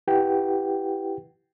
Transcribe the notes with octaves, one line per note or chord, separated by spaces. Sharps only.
E4 G4 B4 F#5 G5